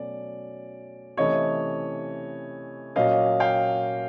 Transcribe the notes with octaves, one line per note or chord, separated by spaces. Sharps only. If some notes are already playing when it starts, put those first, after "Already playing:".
Already playing: B2 F#3 A3 C#4 D5
C3 E3 A3 C#4 C#5 D#5
A#2 F#3 A#3 C#4 D#5 F5
F5 G5